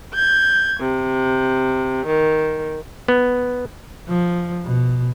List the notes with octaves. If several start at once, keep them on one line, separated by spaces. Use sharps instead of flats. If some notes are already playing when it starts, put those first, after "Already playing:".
G6 G#6
C3
D#3
B3
F3
B2